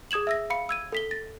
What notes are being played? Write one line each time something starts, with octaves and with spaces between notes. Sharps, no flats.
G#4 D#6 G#6 E7 F#7
E5 E6 A#6
F5 B5 C#7
E6 G#6 D#7
A4 B6 G7
A6 A#6